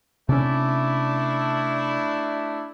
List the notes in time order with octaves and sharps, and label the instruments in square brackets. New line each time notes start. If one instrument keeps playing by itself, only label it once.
[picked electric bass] C3 C#4 [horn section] A3 D4 E4